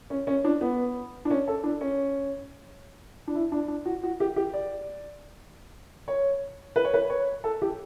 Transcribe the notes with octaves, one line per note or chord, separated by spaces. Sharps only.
C#4
C#4
D4
B3
D4
C#4
A4
D4
C#4
D4
E4
D4
D4
F#4
F#4
G4
G4
D5
C#5
B4
C#5
B4
C#5
A4
G4